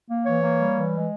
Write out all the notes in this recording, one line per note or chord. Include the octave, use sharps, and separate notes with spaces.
A#3
E3 C#5
A#3
G3
E3
G#3